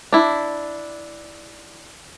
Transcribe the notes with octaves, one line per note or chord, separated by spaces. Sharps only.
D4 E4